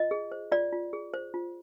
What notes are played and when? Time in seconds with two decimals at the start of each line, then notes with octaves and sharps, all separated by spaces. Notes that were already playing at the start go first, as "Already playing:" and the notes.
Already playing: F4 D#5
0.11 G#4
0.32 C5
0.52 F4 D5
0.72 F4
0.93 G#4
1.14 C5
1.34 F4